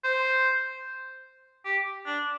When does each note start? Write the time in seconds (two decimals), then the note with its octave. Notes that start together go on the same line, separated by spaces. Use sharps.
0.04 C5
1.65 G4
2.06 D4